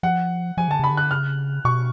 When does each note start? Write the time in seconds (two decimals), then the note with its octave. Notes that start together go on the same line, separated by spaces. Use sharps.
0.03 F3 F#5
0.57 F3 G#5
0.68 D3 A5
0.79 C#3 B5
0.91 D3
0.97 F#6
1.11 C#3 F6
1.65 B2 C#6